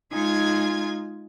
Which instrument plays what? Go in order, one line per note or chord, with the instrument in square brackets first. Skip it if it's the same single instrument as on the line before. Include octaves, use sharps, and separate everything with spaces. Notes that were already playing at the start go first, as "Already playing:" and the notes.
[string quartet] G#3 D#4 F4 G#5 G#6